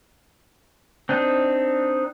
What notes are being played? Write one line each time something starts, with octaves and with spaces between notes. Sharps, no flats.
C4 D4 D#4